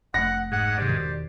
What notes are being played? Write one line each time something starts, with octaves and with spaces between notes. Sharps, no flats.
F1 A3 F#5 A#6
G#2 F#5
A1 C3 G4 C5 D5
E1 B2 D#3